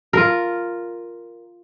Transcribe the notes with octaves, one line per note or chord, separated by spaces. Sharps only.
F4 A#4